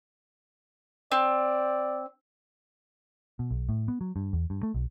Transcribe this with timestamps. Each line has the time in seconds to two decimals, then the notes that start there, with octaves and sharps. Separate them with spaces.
1.12 C4 D5
3.39 B2
3.51 B1
3.69 A2
3.88 B3
4.01 F#3
4.16 G2
4.33 E2
4.50 G2
4.63 A3
4.74 B1